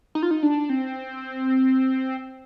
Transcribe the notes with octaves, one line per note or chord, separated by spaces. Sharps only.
D#4
F4
D#4
D4
C4